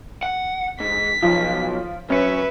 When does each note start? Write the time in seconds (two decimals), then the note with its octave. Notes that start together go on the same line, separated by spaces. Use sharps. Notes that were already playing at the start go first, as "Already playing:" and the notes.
0.23 F#5
0.80 G#2 B6
1.22 B1 F3 F4
2.10 F#2 C#4 B4 E5 C#7